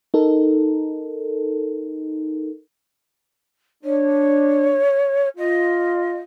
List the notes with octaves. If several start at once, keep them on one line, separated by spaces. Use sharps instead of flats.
D#4 A4 A#4
D4 C#5
F4 D#5